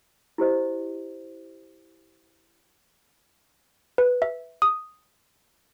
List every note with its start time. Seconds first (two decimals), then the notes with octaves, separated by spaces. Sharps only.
0.38 E4 G4 C5 D#5
3.98 B4
4.22 E5
4.62 D#6